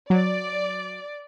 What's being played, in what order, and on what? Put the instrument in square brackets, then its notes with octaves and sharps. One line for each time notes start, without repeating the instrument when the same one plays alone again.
[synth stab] F#3 [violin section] D5